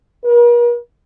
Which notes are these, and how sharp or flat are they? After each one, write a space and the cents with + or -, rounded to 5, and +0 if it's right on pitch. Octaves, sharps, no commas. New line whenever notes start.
A#4 +45